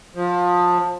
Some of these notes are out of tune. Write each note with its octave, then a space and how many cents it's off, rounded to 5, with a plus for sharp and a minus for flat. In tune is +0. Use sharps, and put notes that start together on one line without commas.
F3 +25